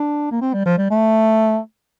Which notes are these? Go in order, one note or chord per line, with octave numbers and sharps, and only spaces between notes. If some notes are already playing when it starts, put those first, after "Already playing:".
Already playing: D4
A#3
C4
G3
F3
G3
A3